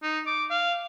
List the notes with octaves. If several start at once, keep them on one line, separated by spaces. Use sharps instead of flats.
D#4
D6
F5